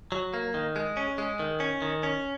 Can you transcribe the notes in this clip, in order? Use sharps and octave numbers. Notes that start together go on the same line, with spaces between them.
F#3
A#3
D#3
G#3
C#4
G#3
D#3
C#4
D#3
C#4